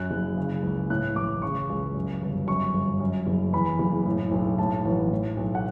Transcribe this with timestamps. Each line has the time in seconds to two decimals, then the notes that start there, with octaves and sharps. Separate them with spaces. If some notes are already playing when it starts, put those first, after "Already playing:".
Already playing: F#2 F#6
0.11 F#1
0.37 C#3
0.63 C#2
0.90 A2 F#6
1.16 A1 D6
1.42 C#3 C#6
1.70 C#2
1.95 F#2
2.22 G1
2.48 F#2 C#6
2.74 G1
3.00 F#2
3.27 F#1
3.53 E2 B5
3.79 F#1
4.06 A2
4.32 B1
4.58 A2 A5
4.85 A1
5.11 A2
5.37 B1
5.55 F#5